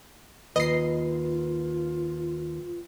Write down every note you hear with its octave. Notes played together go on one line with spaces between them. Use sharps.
D#2 F4 B4 D#5 C7